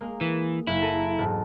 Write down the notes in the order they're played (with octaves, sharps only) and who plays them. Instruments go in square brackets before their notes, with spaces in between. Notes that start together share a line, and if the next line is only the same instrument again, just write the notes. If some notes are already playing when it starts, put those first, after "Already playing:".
[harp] G#3 A#3
[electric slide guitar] E3
[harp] F#1 [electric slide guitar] E4
[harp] A4 A#5 D#7
E1 G#2 A5